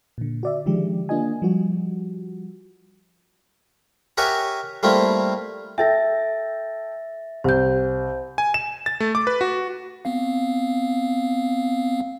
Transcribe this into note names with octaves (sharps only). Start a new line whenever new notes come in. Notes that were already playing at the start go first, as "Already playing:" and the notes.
A#2 D3
F#4 D5 E5
D3 D#3 F3 G#3 G4
A#3 D4 F4 D#5 G#5
F3 G3 F#4
G4 A#4 C#5 E5 F#5 G#5
G3 A3 A#3 C4 E4 F4
A4 E5 G5 A6 A#6
C2 C5 G6
G#5
E7
A6
A3
D6
B4
F#4
B3 C4 F5